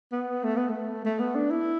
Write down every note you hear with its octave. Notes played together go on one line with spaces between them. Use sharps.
B3
A3
B3
A3
A3
B3
D4
E4